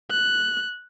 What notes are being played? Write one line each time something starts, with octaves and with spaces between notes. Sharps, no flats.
F#6